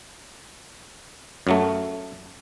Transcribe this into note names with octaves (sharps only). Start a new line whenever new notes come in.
F#2 F#3 A3